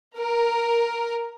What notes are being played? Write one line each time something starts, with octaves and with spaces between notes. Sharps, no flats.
A#4